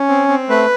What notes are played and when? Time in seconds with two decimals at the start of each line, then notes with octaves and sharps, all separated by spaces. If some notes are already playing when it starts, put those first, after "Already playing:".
Already playing: C#4
0.09 C4
0.29 C4
0.50 A3 B4